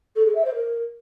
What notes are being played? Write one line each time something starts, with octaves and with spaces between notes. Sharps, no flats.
A4
G#4
E5
C5
A#4